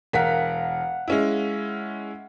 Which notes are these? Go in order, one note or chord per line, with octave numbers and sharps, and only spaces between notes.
E1 A#4 F5 F#5 B6
G#3 C#4 E4